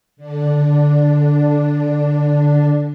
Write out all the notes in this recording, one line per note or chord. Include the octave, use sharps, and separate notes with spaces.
D3 D4